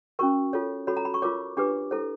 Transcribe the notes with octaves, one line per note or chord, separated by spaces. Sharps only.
C#4 F#4 A#4 C#6
F4 A4 C#5
F#4 A4 C#5 B5
A#5
B5
C#6
F4 A#4 C#5 D6
D4 G4 B4 D6
E4 A4 C5